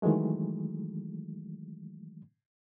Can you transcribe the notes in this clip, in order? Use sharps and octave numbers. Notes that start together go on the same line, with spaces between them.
D#3 E3 F#3 G#3 A3